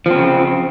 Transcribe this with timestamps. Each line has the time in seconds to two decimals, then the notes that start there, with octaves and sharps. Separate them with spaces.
0.06 F3
0.10 C4
0.15 C#3